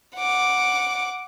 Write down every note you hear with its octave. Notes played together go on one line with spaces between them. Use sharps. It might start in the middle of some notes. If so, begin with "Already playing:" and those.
F#5 D6